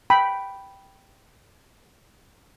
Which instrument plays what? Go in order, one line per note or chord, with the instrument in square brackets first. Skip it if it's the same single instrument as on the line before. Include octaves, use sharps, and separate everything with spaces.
[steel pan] G5 B5